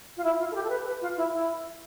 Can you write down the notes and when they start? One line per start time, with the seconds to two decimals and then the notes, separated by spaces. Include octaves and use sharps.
0.17 F4
0.24 E4
0.39 F4
0.51 A4
0.55 G4
0.64 A4
0.70 B4
0.86 B4
1.01 F4
1.17 E4
1.33 E4